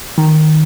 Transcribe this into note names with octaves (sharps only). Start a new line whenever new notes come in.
D#3